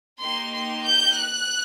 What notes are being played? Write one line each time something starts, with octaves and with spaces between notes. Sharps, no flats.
A#3 D#4 G4 C6
C6
G6
F#6